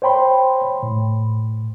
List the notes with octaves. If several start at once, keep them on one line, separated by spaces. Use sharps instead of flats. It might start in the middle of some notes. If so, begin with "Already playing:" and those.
C5 C#5 G5 B5 C6
A2